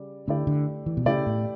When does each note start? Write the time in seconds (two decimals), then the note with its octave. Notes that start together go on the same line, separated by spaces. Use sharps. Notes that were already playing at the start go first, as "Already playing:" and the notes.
Already playing: C#3 G3 D5
0.27 D3 A3 E4 G4 D5
0.47 D3
0.86 E3
0.97 B2
1.05 C#3 A3 E4 G4 D5
1.26 A2